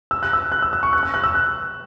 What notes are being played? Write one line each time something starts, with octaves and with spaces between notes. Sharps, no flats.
E6
F#6
E6
F#6
E6
E6
C#6
F#6
E6
F#6
E6
F#6